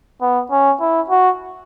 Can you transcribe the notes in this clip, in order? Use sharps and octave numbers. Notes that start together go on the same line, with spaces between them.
B3
C#4
E4
F#4